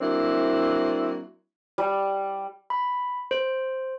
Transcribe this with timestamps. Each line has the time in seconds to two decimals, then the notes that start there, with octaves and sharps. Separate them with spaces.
0.01 F#3 A#3 C4 D4 E4
1.78 G3
2.70 B5
3.31 C5